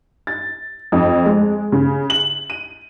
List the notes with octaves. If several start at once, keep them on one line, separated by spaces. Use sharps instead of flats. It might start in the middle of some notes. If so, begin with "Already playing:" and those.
A6
F2
G#3
C#3
F#7
D#7